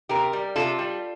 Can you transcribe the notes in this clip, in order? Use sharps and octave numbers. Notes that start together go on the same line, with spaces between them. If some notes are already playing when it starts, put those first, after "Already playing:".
C3 G4 A#4
G3
C3 F4 A4
G3